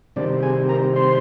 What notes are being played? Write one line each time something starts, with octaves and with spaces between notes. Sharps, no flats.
C3 D#3 G3 C4 D4 D5
G#4 G#5
A#4 A#5
C5 C6